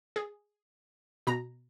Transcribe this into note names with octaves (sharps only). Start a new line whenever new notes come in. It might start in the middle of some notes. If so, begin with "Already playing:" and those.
G#4
B2 A#5